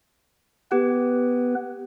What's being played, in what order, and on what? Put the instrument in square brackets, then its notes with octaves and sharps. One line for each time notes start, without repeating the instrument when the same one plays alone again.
[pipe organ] B3 B4 [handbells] G4